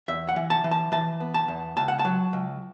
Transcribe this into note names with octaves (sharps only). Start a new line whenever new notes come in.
E2 E5
F#5
E3
A5
E3
A5
E3 A5
B3
A5
E2
C#2 A5
F#5
A5
F#3
C#2